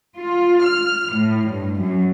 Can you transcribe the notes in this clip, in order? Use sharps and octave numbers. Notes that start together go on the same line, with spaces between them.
F4
F6
A2
G2
F#2